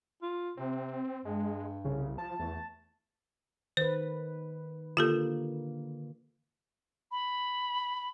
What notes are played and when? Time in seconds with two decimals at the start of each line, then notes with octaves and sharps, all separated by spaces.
0.22 F4
0.57 C3 C4
1.25 G2 G#3
1.85 C2 C#3
2.18 F3 A5
2.40 E2 A3
3.77 D#3 B4 C5
4.97 D3 A#3 F4 G4 A4
7.11 B5